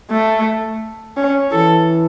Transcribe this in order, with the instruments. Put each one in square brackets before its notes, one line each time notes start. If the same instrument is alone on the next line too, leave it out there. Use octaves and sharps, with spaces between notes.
[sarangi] A3
C#4
[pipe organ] E3 [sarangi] A4